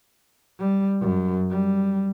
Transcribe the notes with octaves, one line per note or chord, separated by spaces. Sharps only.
G3
F#2
G3